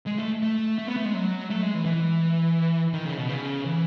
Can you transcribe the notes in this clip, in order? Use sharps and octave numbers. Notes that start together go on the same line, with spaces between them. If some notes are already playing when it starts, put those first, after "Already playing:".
G#3
A3
A3
A3
B3
A3
G#3
F#3
A3
G#3
E3
E3
D#3
C#3
B2
C#3
E3